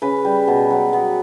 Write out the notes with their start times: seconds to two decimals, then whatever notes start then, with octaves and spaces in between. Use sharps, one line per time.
0.02 C#3 B4
0.25 G3
0.47 B2
0.70 F#3
0.93 B3